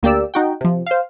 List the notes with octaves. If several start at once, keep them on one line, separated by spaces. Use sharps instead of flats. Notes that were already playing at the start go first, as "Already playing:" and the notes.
D2 A#3 G4 D5 E6
D#4 F#4 G5
C3 F3
C5 F5